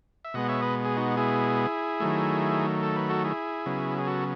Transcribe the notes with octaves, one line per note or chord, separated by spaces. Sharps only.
E5
B2 G#3 B3 D#5 F#5
C#5 E5
B4 D#5
G#4
D#4 F#4
E4 G#4
D#3 F#3 A3
A4
B4
F#4 A4
E4 G#4
C#3 F#3 B3
G#4
F#4 A4